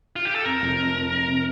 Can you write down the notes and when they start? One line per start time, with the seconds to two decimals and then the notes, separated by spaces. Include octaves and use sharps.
0.16 F4
0.25 G4
0.35 A4
0.45 F2 A#4
0.62 F1
0.78 F2
0.95 F2
1.12 F2
1.28 C3